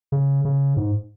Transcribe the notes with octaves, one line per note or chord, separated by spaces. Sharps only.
C#3
C#3
G#2